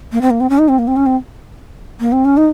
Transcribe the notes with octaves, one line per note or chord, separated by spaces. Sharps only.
A#3
C4
A#3
C4
C#4
D#4
C4
A#3
C4
C#4
C4
A#3
C4
C#4
D#4